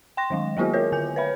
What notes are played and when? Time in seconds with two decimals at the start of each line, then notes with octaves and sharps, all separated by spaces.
0.17 G5 C6 A#6
0.30 D#3 F#3 G#3
0.57 F#3 A#3 B3 E4 F#4 G#4
0.73 F4 A#4 C#5
0.92 D3 G#5 G6
1.16 B4 C#5 E5 B5